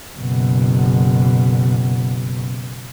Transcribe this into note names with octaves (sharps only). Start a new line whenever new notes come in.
F#1 B2